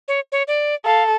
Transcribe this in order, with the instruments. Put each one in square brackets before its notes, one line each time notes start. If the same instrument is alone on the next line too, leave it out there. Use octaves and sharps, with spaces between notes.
[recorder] C#5
C#5
D5
[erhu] A4 [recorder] F5